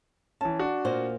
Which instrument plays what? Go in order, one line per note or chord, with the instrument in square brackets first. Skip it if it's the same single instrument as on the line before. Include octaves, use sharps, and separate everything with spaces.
[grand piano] E3 C#4 [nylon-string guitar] A5
[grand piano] D4 F#4
[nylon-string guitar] A#2 A#3 C5